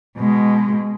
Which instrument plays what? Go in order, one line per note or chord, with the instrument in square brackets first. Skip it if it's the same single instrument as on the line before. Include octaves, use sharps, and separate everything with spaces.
[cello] B2 G#3